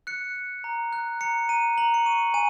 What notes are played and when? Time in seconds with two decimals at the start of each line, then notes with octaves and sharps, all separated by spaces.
0.07 F#6 C#7
0.36 F#6
0.64 A#5
0.93 F#6
1.21 A#5 C#7
1.49 A#5 D#7
1.78 A#5 F#7
1.94 C#7
2.06 C#6 D#7
2.34 G#5 D#7